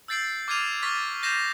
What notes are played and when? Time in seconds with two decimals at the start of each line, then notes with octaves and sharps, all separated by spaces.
0.08 E6 G6 A6 C7 D7 F#7
0.48 D6 F6 G#6 C7 D#7 F7
0.82 C#6 F6 A6 B6 D#7
1.23 G6 A#6 C7 E7 F7